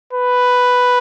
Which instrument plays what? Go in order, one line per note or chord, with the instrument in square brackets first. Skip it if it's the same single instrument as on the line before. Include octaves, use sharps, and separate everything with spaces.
[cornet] B4